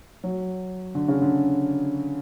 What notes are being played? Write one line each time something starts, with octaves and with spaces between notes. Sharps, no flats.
F#3
D3
C#3
D3